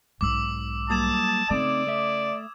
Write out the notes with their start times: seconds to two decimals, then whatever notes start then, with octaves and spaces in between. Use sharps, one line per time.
0.21 B1 G#2 D6 E6
0.90 F#3 G3 A#3 A5 D#6 G#6 E7
1.50 C#3 A3 C4 D#4 D5
1.87 A3 E5